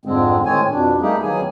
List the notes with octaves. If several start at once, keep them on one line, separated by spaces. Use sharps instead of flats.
F2 G#2 D3 G#3 C4
A2 D#3 G#3 C4 C#5 G#5
F2 B2 D4
G3 A3 A#3 D#4 G4 G#4
D#3 E3 F#3 A#3 G#4 G#5